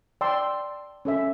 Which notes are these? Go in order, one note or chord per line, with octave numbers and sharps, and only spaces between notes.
D5 G5 A5 C6 E6
C#4 A4 E5